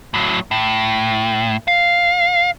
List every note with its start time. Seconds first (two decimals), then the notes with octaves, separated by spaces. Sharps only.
0.14 A2 F#3
0.51 A2
1.68 F5